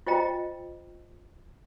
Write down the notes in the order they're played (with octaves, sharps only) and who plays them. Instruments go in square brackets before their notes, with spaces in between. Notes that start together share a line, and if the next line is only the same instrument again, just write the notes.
[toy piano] F4 C5 D#5 G5 A#5